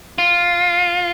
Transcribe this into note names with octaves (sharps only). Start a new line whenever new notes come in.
F4